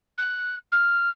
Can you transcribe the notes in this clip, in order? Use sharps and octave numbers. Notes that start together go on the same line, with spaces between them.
F#6
F6